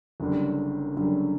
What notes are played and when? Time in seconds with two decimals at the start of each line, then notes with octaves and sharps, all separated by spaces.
0.20 F#1 F#2 D3 G3
0.95 F#1 F#2 D3 G3